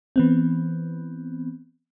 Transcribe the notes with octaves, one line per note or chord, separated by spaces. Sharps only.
E3 B3 C4